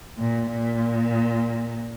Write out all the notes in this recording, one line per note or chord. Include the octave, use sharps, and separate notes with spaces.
A#2
A#2